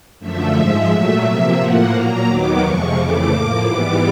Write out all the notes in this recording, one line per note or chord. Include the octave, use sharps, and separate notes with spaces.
F#2 D3 F3 A3 E5
G#2 F3 G#3
A#2 F#3 A3 E5
C3 F3 A#3
A2 F3 A#3 F#5
A#2 F#3 A#3 A#5
D#2 D#3 F#3 B3 D6
F2 C3 F3 G#3 C#6
F2 C#3 E3 A3 D6
A2 F3 A#3
G#2 E3 G3 B3 D6